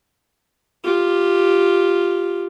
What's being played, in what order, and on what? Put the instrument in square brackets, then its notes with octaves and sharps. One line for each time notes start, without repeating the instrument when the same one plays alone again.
[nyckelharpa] F4 G4